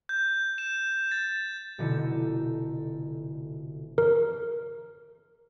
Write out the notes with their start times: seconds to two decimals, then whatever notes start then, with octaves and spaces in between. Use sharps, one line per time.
0.09 G6
0.58 E7
1.11 A6
1.78 F1 B2 D3 D#4 E4 C#7
3.98 A#4